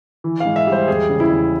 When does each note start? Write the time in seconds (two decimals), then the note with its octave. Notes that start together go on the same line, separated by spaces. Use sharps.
0.24 E3
0.40 G#2 F5
0.56 E5
0.67 G3
0.72 C5
0.88 E2 G#4
1.09 C#3
1.20 E4
1.30 E2